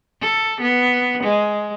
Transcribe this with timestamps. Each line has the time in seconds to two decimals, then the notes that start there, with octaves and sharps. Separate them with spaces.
0.21 A4
0.61 B3
1.23 G#3